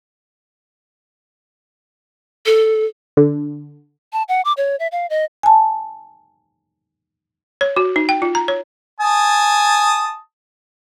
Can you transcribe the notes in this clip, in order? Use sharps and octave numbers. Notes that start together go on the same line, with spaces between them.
A4
D3
A5
F#5
D6
C#5
E5
F5
D#5
G#5 A5
C#5
F#4
D#4
G5
F4
A#5
C#5
G#5 A5 D#6